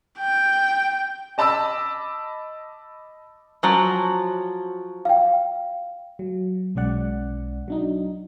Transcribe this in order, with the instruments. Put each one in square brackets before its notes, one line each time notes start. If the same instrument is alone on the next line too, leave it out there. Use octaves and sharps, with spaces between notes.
[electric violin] G5
[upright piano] D#5 A5 B5 D6 E6
[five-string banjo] F3 F#3 C#4
[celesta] F5 G5
[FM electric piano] F#3
B1 G#3 C#4 D5 F#5
F#3 D4 D#4